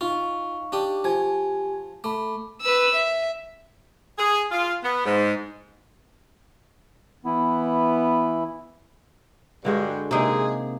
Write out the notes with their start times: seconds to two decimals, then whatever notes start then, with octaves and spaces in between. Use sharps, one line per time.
0.01 D#4 F4 F5 C#6
0.72 D4 G4 D#6
1.04 F3 G4 G#5 G#6
2.04 A3 B5 D6
2.62 B4 E6
2.95 E5
4.18 G#4
4.51 F4
4.84 B3
5.05 G#2
7.25 E3 B3 E4
9.65 G2 D3 G#3 F#4
10.11 C3 G#3 A#3 D#4 G#4